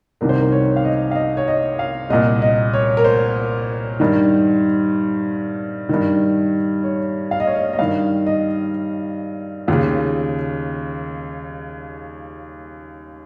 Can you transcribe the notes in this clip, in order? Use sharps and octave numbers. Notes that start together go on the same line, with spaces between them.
C2 C3 D#3 A#4
C5
A#4
C#5
F5
D#5
F5
D#5
C#5
D#5
F5
C2 A#2 D#5
D#5
C#5
A#4
C5
G2 D#3
G2 D#3
C#5
F5
D#5
C#5
D#5
D#5
G2 D#3 F5
D#5
D#2 C#3 F4